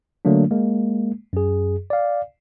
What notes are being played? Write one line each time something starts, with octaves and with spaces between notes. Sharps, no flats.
D3 F#3 A3 A#3 D4
G#3 A#3
F#2 G#4
D5 F5